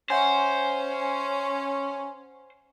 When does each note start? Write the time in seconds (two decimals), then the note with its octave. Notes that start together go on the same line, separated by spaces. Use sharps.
0.10 C#4 C5 E5 F#5 G#5